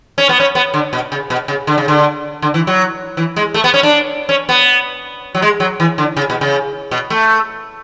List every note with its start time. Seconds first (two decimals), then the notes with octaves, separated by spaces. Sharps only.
0.18 C#4
0.29 B3
0.40 C#4
0.55 B3
0.74 D3
0.93 B2
1.12 C#3
1.30 B2
1.48 C#3
1.67 D3
1.78 C#3
1.88 D3
2.42 D3
2.54 E3
2.67 F#3
3.17 E3
3.36 G#3
3.54 A3
3.64 B3
3.74 C#4
3.83 D4
4.29 C#4
4.49 B3
5.35 F#3
5.42 G#3
5.60 F#3
5.80 E3
5.98 D3
6.17 C#3
6.30 B2
6.41 C#3
6.91 B2
7.10 A3